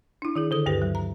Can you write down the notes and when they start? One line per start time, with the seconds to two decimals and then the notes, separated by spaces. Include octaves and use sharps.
0.22 D4 E4
0.36 D#3 E4 G#4
0.51 D3 A4 D#6
0.66 D2 G2 G4 B4
0.82 F#3
0.95 A#5